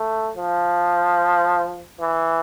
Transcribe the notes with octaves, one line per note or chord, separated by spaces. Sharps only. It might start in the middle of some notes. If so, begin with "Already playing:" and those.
Already playing: A3
F3
E3